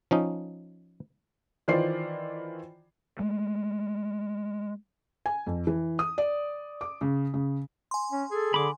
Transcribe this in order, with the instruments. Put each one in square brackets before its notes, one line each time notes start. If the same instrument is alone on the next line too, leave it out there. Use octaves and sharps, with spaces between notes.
[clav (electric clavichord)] F3 C#4 D#4
[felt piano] D#3 E3 F4 C5 D5 C7
[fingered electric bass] G#3 A3
[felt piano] G#5
F2
E3
D#6
D5
D6
C#3
C#3
[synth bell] G#5 C6
[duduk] C#4
[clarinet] G#4 [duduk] A4
[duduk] D3 [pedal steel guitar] B5 D6